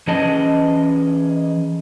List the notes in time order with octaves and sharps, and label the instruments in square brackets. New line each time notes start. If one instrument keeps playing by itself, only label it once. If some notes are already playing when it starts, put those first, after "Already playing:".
[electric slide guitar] E3 C#4 G#4 D#5 A5